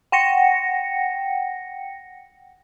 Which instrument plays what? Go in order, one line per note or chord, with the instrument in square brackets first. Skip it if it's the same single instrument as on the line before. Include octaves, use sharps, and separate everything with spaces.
[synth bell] F#5 G5 A#6 C#7